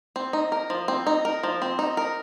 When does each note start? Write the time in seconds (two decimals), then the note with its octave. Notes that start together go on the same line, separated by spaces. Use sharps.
0.16 C4
0.33 D#4
0.52 A#4
0.70 F3
0.88 C4
1.07 D#4
1.25 A#4
1.43 F3
1.62 C4
1.79 D#4
1.97 A#4